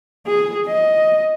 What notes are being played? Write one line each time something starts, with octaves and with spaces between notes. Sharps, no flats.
G#4
D#5